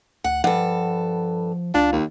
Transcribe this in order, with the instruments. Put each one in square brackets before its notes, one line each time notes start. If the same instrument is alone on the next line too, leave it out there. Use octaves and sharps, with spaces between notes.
[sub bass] D2 [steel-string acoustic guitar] F#5
[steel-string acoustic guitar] G2 A4 [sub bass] F3 [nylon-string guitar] F#5
[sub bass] C#2 [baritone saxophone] D4 [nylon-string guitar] F4
[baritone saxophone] D#2